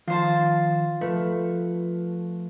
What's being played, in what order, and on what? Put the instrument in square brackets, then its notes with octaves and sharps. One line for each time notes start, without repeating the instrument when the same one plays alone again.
[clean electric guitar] D#3 F3 [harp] F4 C5 A5
[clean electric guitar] F3 B4 [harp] A3